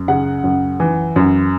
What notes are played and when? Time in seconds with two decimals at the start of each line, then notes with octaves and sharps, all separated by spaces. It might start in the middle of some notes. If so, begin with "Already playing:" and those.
Already playing: F#2
0.08 C#3 F#5
0.44 F#2
0.80 E3
1.16 F#2